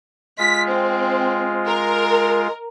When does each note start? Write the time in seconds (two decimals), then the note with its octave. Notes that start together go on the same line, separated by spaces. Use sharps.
0.39 G#3 F4 B6
0.70 C4
1.67 A#4